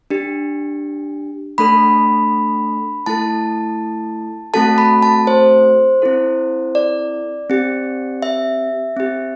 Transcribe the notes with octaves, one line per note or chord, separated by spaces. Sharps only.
D4 G4
A3 D4 A4 B5
A3 E4 A4 A5
A3 C4 F#4 A4 A5
B5
A5
C5
C4 E4 A4
D5
C4 G4
E5
C4 G4